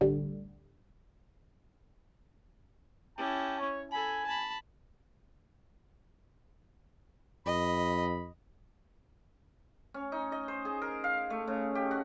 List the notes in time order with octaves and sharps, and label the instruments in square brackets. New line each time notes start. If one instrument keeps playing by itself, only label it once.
[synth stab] A1 D2 D3 G3
[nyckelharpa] C#4 E4 [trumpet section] G4 G5 A5
[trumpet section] C#5
[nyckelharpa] A4 B5 [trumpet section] G#5
[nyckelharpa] A5 B5
[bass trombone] F2 [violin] D#5 [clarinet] B5
[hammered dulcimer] C#4
D#4
D#5
C5
G#4
A#4
F5
A3
C#3
G4
F#4